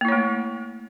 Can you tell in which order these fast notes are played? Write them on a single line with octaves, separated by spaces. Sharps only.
A#3 E4 C#5 A3